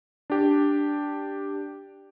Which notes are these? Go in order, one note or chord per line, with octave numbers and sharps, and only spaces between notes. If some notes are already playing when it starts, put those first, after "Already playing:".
D4 G4